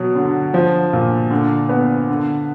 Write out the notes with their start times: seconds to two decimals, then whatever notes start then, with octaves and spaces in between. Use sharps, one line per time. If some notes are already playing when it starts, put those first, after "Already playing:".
Already playing: B2 F#3
0.15 D3
0.54 F3
0.93 A#2
1.31 D3
1.69 B3
2.09 D3